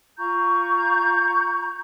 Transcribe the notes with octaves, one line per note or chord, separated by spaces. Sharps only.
F4 A#5 C#6 G6